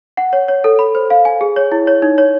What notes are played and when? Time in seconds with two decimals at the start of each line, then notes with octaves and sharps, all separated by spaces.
0.17 F#5
0.33 C#5
0.48 C#5
0.64 A4
0.79 B5
0.95 C5
1.10 F5
1.25 G#5
1.41 G#4
1.56 C#5
1.72 E4
1.87 C#5
2.02 D#4
2.18 C#5